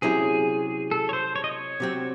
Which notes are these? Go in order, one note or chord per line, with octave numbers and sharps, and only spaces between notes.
C3 F#3 C#4 E4 G#4
A4
C#5
C5
C#5
D#5
C#5
C3 F#3 C4